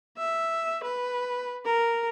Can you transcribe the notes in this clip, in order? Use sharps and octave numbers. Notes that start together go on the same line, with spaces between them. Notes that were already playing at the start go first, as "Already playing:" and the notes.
E5
B4
A#4